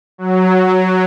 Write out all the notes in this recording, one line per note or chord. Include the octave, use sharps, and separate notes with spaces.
F#3